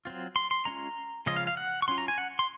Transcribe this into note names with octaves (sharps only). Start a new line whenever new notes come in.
F#3 C4 F4
C6
C6
G#3 C#4 F4 A#5
C#3 F3 G#3 C#4 F4 D#5
F5
F5
F#5
C#6
F#3 C#4 F4 C6
A#5
G#5
F#5
C6